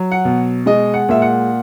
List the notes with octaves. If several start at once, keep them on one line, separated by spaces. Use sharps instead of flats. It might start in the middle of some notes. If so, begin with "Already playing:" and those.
Already playing: F#3
F#5
B2
G#3 D#5
F#5
A#2 E5
F#5